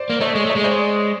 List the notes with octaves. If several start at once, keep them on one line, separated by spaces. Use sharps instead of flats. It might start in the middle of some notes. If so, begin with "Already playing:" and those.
Already playing: C5 D5
A#3
A3 C#5 D#5
G#3
A3 C#5 D#5
G#3
C5 D5